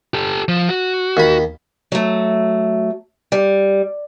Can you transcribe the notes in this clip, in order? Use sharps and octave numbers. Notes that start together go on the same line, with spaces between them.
G4 A4
F3
F#4
D#2 B5
F#3 A3
G3